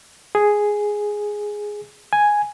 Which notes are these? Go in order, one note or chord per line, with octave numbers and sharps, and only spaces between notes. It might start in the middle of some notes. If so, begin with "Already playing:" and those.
G#4
G#5